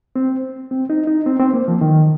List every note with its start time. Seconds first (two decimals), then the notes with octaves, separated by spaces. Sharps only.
0.16 C4
0.71 C4
0.90 D#4
1.07 D#4
1.26 C4
1.39 C4
1.54 A#3
1.68 F3
1.81 D#3